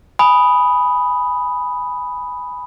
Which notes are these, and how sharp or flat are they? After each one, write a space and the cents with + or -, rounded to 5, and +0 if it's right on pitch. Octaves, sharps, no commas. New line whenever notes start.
G#5 +0 B5 +0 D#6 +0